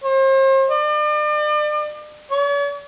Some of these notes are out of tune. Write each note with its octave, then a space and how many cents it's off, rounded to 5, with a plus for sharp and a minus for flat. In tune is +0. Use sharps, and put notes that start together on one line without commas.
C5 +40
D5 +40
C#5 +45